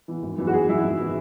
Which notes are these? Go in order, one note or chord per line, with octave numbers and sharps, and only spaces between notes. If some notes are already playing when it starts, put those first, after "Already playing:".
E3 B3
G#1
F#2 E3 B3
F#4
G#1 G#4
F#2 E3 B3 E4
G#1
E3 B3